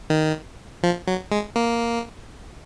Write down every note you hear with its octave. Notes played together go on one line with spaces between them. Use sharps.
D#3
F3
F#3
G#3
A#3